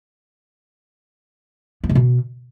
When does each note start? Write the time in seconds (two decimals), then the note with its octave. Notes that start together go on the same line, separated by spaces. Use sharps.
1.84 B3
1.89 C3
1.95 B2